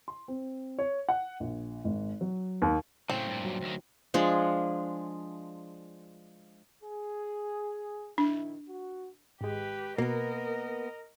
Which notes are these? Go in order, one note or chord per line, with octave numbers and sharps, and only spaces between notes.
C6
C4
C#5
F#5
A#1
G#1
F#3
D#2
A2 C#3 F#3 C4
G2 A#2
F#3
D2 D#3
F3 G#3 D4
G#4
A#1 D#3 D4 E4
F#4
G#1 G#3 G4 B4
B2 A#3 B3 A#4 D#5